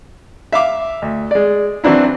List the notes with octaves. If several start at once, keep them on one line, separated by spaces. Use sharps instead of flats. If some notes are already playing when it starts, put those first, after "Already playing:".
E5 F5 D6
D2
G#3 D5
E3 F#3 C4 D4 E4